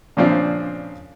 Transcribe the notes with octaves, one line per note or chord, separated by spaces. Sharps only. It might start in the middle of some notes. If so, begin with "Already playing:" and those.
A#2 C#3 F3 C4 D4